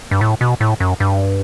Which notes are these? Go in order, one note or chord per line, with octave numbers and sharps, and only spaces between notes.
G2
A2
B2
A2
F#2
G2